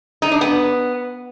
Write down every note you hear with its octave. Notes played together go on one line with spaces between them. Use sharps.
D#4
D4
B3